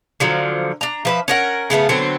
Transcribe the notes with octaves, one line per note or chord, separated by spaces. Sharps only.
D3 F3 F#3
D4 A#5
F3 B4 E5
C#4 A#4 F#5
C#3 G#3 A3 B3
D3 F#3 B3 C4